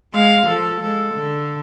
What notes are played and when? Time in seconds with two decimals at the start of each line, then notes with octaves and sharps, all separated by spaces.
0.14 G#3 F5
0.47 F3 A4
0.82 G#3 A4
1.15 D3